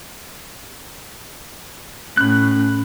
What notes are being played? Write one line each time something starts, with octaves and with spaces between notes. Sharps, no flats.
A2 C#4 B5 F#6